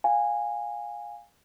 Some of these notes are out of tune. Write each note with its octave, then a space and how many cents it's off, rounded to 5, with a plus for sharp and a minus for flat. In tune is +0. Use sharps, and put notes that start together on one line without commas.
F5 +15 G#5 -15